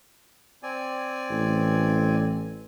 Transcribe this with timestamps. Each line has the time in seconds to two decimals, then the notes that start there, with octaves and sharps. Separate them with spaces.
0.63 C4 D5 G#5
1.30 A1